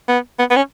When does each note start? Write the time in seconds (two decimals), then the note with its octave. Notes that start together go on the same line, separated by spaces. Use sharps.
0.08 B3
0.39 B3
0.50 B3
0.56 C#4